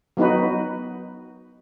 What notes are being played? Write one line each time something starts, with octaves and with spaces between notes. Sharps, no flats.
F#3 B3 D#4 F#4 B4